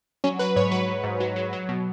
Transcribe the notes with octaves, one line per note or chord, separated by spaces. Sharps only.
F#3 C#4
F#3 B4
G#2 C#5
F#3 B4
F#3
G#2
F#3
F#3
F#3
B2